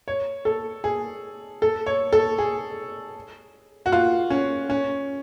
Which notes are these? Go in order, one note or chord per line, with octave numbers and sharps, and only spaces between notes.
C#5
A4
G#4
A4
C#5
A4
G#4
F#4
F4
C#4
C#4